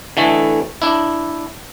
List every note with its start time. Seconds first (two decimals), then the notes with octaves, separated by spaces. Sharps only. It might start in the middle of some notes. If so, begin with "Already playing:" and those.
0.17 D3 E3 A3
0.82 D4 E4